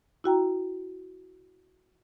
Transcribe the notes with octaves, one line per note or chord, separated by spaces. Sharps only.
E4 F#4 G5 A#5